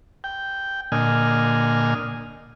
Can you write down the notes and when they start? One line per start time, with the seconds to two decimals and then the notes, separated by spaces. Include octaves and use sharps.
0.24 G5
0.92 A#2 D3 D#5 G#5 F6